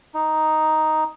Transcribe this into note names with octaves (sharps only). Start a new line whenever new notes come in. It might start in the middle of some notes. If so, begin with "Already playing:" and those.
D#4